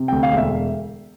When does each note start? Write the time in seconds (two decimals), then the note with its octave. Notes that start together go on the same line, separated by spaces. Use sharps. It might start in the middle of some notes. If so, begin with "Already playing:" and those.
Already playing: C3
0.08 D2 G5
0.23 F5
0.32 E1 E5